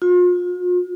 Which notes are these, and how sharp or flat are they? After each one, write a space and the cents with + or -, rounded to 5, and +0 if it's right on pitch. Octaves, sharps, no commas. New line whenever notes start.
F4 +40